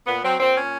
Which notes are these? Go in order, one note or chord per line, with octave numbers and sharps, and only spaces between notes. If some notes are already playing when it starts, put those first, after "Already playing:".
A#2 B3
F#3 C4
A#2 C4
A#2 C#4